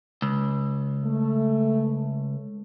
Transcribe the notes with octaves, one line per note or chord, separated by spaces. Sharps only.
C#2
A3